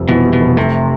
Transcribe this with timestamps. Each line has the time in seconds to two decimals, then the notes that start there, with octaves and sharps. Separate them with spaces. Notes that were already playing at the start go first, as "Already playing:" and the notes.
Already playing: F1 F2 G3
0.09 B2 E3
0.25 G3
0.33 B2
0.41 F1
0.57 C3 A3